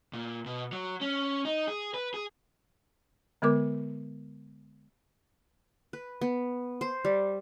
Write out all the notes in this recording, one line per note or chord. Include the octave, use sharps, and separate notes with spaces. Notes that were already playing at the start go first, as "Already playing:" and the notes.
A#2
B2
F#3
C#4
D#4
G#4
B4
G#4
D3 G#3 B3 A#4 D6
B4
B3
C5
G3